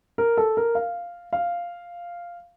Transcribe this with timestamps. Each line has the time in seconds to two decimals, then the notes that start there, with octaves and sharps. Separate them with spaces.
0.18 A#4
0.37 A4
0.57 A#4
0.75 F5
1.33 F5